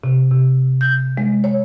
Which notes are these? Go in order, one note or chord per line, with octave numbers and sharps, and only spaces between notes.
C3
C3
G6
G#3
C#5